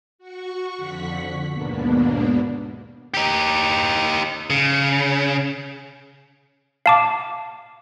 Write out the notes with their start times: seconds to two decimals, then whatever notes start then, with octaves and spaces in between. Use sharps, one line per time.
0.19 F#4 C#6
0.78 F2 D3 F#5 C#6 F#6 B6
1.51 D#2 G#2 B2 A#3 B3 D4
3.14 D#4 G4
4.50 C#3
6.86 F5 A5 D6